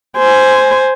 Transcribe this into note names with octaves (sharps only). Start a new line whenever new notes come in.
C5 G#5